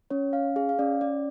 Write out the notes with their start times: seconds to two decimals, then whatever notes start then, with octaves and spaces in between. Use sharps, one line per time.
0.10 C#4 C#5
0.33 C#4 F5
0.56 G#4 F5
0.69 F5
0.79 C#4 D5
1.01 C#4 D5